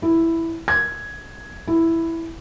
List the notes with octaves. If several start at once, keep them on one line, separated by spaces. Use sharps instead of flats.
E4
G#6
E4